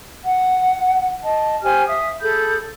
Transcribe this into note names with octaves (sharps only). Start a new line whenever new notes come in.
F#5
D#5 A5
G4 C5 G#5 F6
E5 F5 D#6
G#4 A4 B5 G6